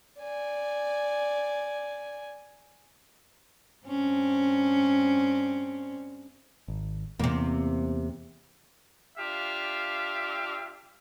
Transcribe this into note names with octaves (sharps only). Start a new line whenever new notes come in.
D5 G#5
G2 C4 C#4
G#1
E2 C3 A#3
D4 F4 G4 E5 F5